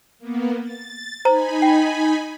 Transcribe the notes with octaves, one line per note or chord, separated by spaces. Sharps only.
A#3 B3
A6
D#4 C5 G#5 A#5 B5
G5